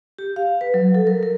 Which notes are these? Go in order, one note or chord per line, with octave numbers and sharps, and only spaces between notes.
G4
F5
B4
F#3
A4
A#4
A#4